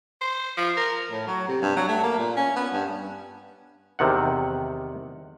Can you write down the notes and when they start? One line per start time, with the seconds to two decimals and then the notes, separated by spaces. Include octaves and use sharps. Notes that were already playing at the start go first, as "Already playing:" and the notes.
0.21 C5
0.57 F3
0.77 A#4
1.11 A2
1.27 F#3
1.48 C3
1.62 G2
1.76 F#3
1.88 A3
2.03 A#3
2.18 A#2
2.37 C#4
2.56 B3
2.73 G2
3.99 E2 C3 D#3 F#5